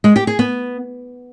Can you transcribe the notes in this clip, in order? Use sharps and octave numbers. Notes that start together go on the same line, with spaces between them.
G#3
G4
G#4
B3